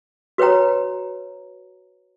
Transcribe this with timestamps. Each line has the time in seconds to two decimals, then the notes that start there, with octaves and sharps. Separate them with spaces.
0.38 F#4 B4 C#5 G5 A#5